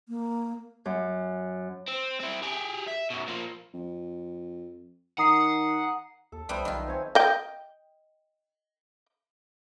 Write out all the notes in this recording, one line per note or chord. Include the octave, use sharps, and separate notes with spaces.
A#3
F#2
C4
C4 E4
G4 G#4
E5
F#2 B2
F3 A#3
F2
D#3 F#5 A#5 D#6 C7
D#2 A4
C2 G3 B3 B4 C5 E5
B1 D#3 F4
C4 C#5 G#5
D#5 G5